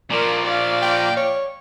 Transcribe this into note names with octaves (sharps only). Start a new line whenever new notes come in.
A#2 F3 A#4 D5
D5 F5
G5
C#5